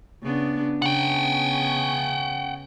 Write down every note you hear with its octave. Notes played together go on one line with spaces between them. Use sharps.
C#3 B3 D4
C#3 B3 C#4 F#5 G5